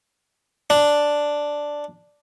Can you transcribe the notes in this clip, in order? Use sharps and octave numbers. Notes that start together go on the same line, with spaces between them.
D4